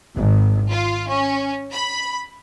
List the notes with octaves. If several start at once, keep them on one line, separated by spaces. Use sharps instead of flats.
G#1
F4
C#4
B5